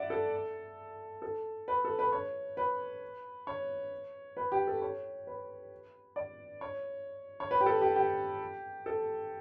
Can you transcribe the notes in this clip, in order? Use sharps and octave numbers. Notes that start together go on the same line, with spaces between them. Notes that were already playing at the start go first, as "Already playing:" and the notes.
Already playing: D5 E5 F#5
A4
A4
B4
A4
B4
C#5
B4
C#5
B4
G4
A4
C#5
B4
D5
C#5
C#5
B4
G4
A4
G4
G4
A4